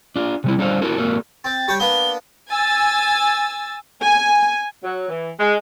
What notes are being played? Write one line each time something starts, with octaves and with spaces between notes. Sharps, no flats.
D4 F4
C3 G3 E4
G3 D4 A4 C5 F5
E4 F#4 A4 A#4
A#3 F#4 A4 A#4
C4 A6
G3 C#5 G5
A#3 B3 D4 G7
G#5 E6 A6
G#5
F#3
E3
G#3